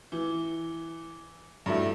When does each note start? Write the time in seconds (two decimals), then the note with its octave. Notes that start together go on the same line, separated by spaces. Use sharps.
0.12 E3
1.66 G2 F#3 A3 E4